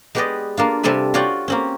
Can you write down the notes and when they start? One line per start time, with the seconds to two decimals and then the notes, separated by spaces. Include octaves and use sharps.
0.15 G#3 B3 G4 B4 D5 D#5
0.57 A#3 D4 F4
0.83 C3 G3 C4 A4 G#5 B5
1.14 F4 F#4 C#5 D5 F#5 G5
1.48 A#3 C4 C#4